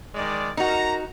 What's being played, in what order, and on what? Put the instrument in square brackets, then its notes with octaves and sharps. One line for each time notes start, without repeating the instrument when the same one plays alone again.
[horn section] D#3 G#3 D5
[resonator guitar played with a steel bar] D#4 F#4 [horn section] A#4 A#5